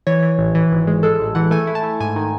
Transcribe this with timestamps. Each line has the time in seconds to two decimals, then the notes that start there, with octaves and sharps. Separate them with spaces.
0.07 E3 C#5
0.23 E3
0.39 A1
0.55 E3
0.72 G#1
0.87 G#3
1.03 G#3 A4
1.20 A1
1.35 E3 F#5
1.51 A3 G#5
1.67 E4
1.75 A5
1.84 A3
2.00 G#2 G#5
2.16 D#3